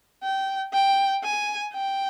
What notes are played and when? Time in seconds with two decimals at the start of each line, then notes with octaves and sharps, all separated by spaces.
0.23 G5
0.73 G5
1.24 G#5
1.74 G5